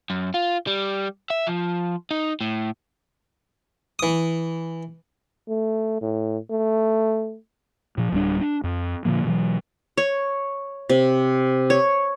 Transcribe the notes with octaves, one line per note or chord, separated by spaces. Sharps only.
F#2
F4
G3
E5
F3
D#4
A2
E3 D#6
A3
A2
A3
A#2 F3
D1 G3 D4
D4
F2
A#2 D3 F3 A#3
B2 E3 F#3
C#5
C3
C#5